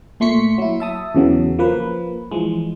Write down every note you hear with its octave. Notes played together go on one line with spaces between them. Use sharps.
A#2 A3 C6 C#6 B6 C#7
F#3 E4
E5 A5 D#6
E2 C#3 E3 F#3
F3 A#3 B4
E3 F3 G#3